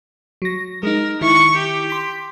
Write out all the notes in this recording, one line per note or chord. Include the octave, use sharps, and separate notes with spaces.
F#3 A#6
G#3 D#4 A#4
D#3 E4 C#6
G4
C6 B6